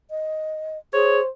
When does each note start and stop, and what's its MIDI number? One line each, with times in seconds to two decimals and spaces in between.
0.11 0.78 75
0.94 1.20 68
0.94 1.29 72
0.94 1.20 73